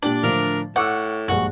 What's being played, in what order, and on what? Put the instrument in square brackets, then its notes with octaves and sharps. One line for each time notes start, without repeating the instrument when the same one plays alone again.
[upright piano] A#2 G4 F#7 [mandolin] D4
[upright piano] A2 D3 F3 [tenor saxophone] A#4
[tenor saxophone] A2 [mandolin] F#5 [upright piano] C#6 D6 E6
[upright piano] A#1 G2 G#3 [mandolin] F#4